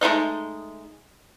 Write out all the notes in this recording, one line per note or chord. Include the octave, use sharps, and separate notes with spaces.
G#3 A3 D#4 D#5